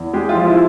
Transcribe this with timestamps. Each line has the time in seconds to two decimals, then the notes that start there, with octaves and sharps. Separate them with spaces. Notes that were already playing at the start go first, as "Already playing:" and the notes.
Already playing: E2
0.14 G#3 G4
0.29 F4
0.35 F3
0.46 E4